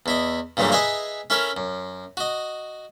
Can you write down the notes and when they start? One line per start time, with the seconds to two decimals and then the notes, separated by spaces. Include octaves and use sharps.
0.06 E2 E4 D#5
0.57 G2 A#2 C#3 E3 F#3 A3
0.72 G#4 B4 D#5 E5 G#5 A#5
1.30 C#4 E4 A4 A#4 C#5
1.57 F#2
2.17 F#4 D#5